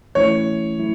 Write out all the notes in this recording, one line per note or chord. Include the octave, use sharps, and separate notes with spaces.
E3 A3 C#4 E4 C#5
F#3 A3 E4